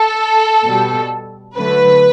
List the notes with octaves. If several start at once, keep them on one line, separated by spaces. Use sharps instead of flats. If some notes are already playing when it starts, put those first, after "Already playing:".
Already playing: A4
B2 G3
D3 F#3 A3 B4